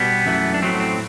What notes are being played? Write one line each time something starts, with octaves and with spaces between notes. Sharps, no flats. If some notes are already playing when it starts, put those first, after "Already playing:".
Already playing: B2 G3 B3
F#2 E3 A3
D4
A2 F#3 A3 C4
C4